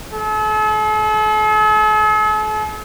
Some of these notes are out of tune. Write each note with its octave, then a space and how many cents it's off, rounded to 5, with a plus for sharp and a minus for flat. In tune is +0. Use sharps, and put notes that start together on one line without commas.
A4 -45